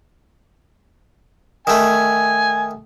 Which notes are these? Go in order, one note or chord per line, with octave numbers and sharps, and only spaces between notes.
D#3 A3 G#5